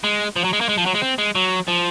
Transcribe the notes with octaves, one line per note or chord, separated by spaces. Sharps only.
G#3
F3
F#3
G#3
A#3
G#3
F3
F#3
G#3
C4
G#3
F#3
F3